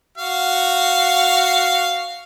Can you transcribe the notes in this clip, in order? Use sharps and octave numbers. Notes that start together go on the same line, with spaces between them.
F#4 F5